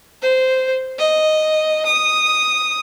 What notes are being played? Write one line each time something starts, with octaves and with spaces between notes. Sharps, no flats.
C5
D#5
D#6